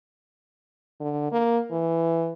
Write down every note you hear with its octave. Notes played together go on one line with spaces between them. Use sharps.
D3
A#3
E3